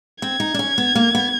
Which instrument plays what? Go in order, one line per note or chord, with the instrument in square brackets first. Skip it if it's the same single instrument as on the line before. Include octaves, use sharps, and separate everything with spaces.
[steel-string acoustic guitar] C4 [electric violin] G#6
[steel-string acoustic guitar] D#4
D4
C#4
B3
A#3
B3